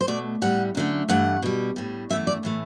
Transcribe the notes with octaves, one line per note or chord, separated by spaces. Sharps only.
C5
B2 A3 D5
A2 G3 F#5
F#2 D3 A3
G2 E3 A3 F#5
B2 G3
A2 G3
F#2 E3 A3 E5
D5
A2 E3 A3